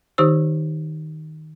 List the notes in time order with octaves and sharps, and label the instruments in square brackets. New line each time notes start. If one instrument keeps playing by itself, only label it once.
[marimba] D#3 D#4 G4 C5 E6